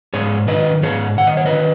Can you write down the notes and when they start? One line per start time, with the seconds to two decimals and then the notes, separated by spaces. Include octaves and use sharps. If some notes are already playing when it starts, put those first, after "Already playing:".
0.14 G#2 G#4 C#5
0.48 D#3 B4 D#5
0.83 G#2 G#4 C#5
1.18 D#3 F#5
1.27 D#5
1.37 C#5
1.46 B4 D#5
1.52 D#3